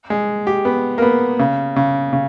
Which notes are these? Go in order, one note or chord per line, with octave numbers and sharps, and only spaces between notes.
G#3
G4
B3
A#3
B3
C#3
C#3
C#3